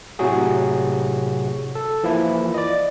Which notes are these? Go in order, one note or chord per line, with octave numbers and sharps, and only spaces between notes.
A2 C3 F#3 F#4 G#4
A4
E3 F3 A#3 E4
D5 D#5